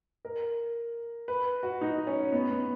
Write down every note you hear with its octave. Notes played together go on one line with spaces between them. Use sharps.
A#4
B4
F#4
D#4
C#4
B3
B3